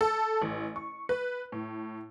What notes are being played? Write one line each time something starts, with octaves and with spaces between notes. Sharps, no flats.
A4
A1
C#6
B4
A2